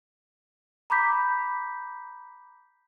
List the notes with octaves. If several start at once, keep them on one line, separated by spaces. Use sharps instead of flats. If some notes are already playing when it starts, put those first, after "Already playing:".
A#5 B5 D6 G6 B6